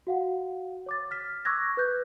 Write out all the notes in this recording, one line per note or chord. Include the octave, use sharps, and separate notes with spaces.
F#4 F5 F#5
C#5 D6 A6
F6 B6
C#6 D6 E6 F#6 G#6 A#6
B4 F#6 G6